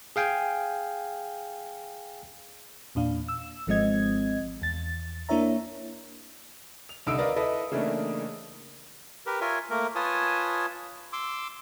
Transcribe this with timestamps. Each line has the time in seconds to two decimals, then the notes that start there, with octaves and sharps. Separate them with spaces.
0.16 G#4 F5 G5 G#5
2.95 E2 A#2 D4 F5
3.28 E6
3.67 G#1 F3 G#3 C4 D#5 G#6
4.62 E2 A6
5.29 A#3 D4 E4 C#5 E5 A#5
6.89 F7
7.06 C2 D3 D#4 E6 D7
7.18 A#4 B4 D5 D#5 F5
7.36 E4 A4 B4 D#5
7.71 C#3 E3 A3 A#3 D4 D#4
9.26 G4 A#4 B4
9.41 F4 A#4 C#5 E5 G#5
9.70 A3 A#3 A#4
9.95 F4 B4 C#5 G#5 A5 D#6
11.13 C6 D6 E6